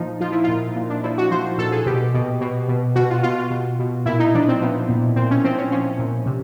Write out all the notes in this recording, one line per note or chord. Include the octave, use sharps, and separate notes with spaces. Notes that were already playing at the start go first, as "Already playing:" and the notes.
Already playing: A#2 F3 D#4
F3 F4
E4
A#2 F4
A#2
D4
F3 E4
F#4
F3 C5
A#2 A4
G#4
B2 G4
B2
B2
B2
B2 F#4
F4
B2 F4
F4
B2
B2
A#2 E4
D#4
F3 D4
C4
F3 B3
A#2
A#2 C4
C#4
F3 C4
C#4
F3 C#4
A#2
C3